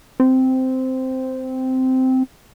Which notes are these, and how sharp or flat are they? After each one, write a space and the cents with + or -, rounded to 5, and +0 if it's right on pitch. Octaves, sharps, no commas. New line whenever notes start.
C4 -10